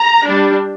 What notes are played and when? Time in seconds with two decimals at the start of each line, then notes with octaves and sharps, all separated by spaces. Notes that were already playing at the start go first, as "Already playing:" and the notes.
Already playing: A#5
0.25 G3 D4